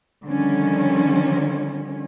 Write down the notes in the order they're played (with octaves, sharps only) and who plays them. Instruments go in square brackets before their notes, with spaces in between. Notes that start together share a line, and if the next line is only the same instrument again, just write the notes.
[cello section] D3 D#3 F3 G3 C#4